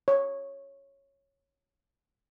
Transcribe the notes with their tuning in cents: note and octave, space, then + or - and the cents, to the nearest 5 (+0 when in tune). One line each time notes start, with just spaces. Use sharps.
C#5 -5